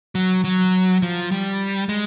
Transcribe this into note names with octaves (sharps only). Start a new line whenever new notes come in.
F#3
F#3
F3
G3
G#3